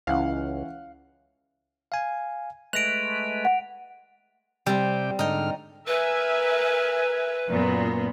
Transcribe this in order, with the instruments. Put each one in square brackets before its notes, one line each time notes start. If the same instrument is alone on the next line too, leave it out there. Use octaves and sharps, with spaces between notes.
[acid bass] C#2 [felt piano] E3 C#4 [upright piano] F5 F#5
[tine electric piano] F5 G#5
[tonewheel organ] G#3 A3 B4 [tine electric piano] F#6 A#6 [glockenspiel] D7 F7
[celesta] F#5
[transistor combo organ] C3 G4 G5 [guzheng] G3 C4
[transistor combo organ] G#2 D3 F6 [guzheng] D#4 G5
[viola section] A#4 E5 G#5 [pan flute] B4
[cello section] F#2 A#2 B3